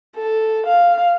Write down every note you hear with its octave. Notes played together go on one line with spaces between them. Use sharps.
A4
F5